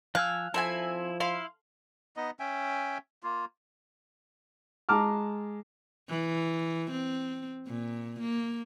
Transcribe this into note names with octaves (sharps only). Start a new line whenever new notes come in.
F3 F5 G#5 E6 F#6
F3 C4 E4 A4 E5 G#5
E4 F5 C6
B3 D#4 D#5
C#4 E5 G5 G#5
A#3 F4
G#3 A5 A#5 D6 F6
E3
C4
A#2
A#3